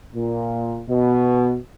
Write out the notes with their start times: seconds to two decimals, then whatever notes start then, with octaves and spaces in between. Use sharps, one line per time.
0.16 A#2
0.89 B2